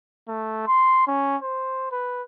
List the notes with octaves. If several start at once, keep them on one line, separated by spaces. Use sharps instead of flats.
A3
C6
C#4
C5
B4